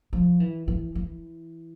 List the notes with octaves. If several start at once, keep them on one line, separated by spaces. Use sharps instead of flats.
F3
E3
E3
E3